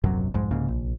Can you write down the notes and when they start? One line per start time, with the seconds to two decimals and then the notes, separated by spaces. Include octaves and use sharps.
0.04 D#1 A#1 F#2 C3 F#3
0.34 B1 F2 G#2 G#3
0.51 C2 G#2 C#3 A#3
0.68 A#1